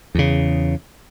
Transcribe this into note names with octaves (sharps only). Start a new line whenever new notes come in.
E2 C#3